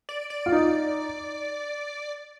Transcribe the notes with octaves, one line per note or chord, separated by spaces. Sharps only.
D5
D5
F4
D#4